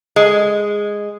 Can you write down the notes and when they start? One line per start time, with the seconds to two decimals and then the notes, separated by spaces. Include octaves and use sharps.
0.16 G#3